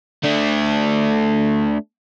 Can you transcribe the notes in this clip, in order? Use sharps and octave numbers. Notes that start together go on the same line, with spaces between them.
A3 D4